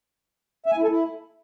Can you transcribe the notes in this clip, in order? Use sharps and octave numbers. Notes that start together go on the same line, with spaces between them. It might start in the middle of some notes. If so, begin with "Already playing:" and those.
E5
G#5
E4
A4
E4